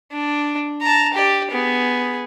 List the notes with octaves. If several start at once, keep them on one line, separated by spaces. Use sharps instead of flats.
D4
A5 A#5
G4 D5
B3 G#4